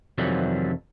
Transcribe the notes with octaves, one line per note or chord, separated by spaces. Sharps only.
F2 C3 D#3 E3 F#3 G3